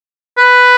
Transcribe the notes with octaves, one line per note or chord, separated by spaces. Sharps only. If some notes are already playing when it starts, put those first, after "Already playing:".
B4